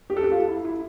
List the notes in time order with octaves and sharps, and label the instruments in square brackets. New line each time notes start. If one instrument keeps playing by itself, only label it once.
[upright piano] G4
A4
G4
F4
E4
E4